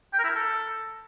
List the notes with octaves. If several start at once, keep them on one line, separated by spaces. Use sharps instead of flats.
G5
A#4
E4
A#4
A4